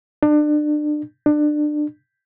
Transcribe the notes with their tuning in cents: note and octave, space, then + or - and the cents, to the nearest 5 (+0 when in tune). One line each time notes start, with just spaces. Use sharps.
D4 +30
D4 +25